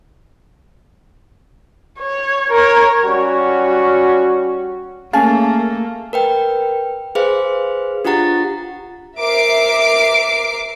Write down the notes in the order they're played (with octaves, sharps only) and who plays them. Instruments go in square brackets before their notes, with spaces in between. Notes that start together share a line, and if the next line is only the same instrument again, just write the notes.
[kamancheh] C#5
A#4 C#5
[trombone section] G3 C#4 F#4
[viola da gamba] A3 A#3 [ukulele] C#4 G#4 [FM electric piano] F5 A5 F6
[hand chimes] A#4 B4 G5
G#4 B4 C5 F5
D4 F4 G4 F#5 A#5 A6
[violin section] A#4 E5 D6 C7 D7